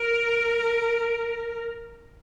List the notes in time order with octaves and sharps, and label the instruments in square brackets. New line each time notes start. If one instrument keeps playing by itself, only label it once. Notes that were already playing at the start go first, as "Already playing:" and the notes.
Already playing: [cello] A#4